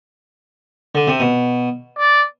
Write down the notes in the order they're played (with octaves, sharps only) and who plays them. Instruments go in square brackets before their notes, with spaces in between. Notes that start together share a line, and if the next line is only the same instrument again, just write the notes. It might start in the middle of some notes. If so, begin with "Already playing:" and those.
[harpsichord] D3
C3
B2
[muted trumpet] D5